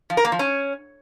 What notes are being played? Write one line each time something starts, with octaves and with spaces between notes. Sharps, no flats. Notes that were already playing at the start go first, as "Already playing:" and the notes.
F3
A#4
A#3
F3
C#4